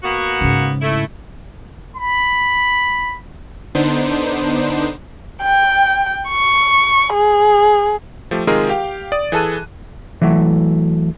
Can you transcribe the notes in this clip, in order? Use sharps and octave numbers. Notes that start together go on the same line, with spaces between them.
A#3 B3 F#4
G#2 C#3
A3 E4
B5
D3 B3 D4 D#4 C5
G5
C#6
G#4
F3 A3 G4
C3 D#3 G#3 F4 G#4 A#4
G4 F5 G5
D5 D#6
E3 G#4 A4 A5 F#6 D#7
E3 F#3 A3